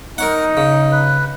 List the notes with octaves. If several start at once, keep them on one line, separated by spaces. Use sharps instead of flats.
D#4 A#4 C#5 F#5
C#3
B4